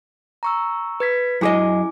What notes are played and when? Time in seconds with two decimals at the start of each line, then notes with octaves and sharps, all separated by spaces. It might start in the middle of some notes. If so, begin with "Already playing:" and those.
0.43 A#5 C#6 E6
1.00 B4 G#6 B6
1.41 F#2 E4 G#4 D#5 G#5 D6